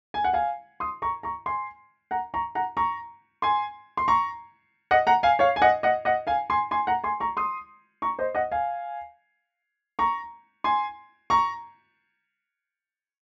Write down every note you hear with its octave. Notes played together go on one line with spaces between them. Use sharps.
G#5
F#5
F5 G#5
C6 D#6
A#5 C#6
A#5 C#6
G#5 C6
F#5 A#5
A#5 C#6
F#5 A#5
A#5 C#6
G#5 C6
C6
A#5 C#6
D#5 F#5
F#5 A#5
F5 G#5
C#5 F5
G#5
D#5 F#5
D#5 F#5
D#5 F#5
F5 G#5
G#5 C6
G#5 C6
F#5 A#5
G#5 C6
A#5 C#6
C6 D#6
A#5 C#6
C5 D#5
D#5 F#5
F5 G#5
A#5 C#6
G#5 C6
A#5 C#6